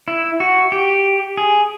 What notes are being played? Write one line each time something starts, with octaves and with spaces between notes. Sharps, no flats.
E4
F#4
G4
G#4